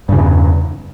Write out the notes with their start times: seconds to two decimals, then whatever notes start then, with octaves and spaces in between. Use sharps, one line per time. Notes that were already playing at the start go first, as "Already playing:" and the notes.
0.09 G2
0.12 C#3
0.16 E2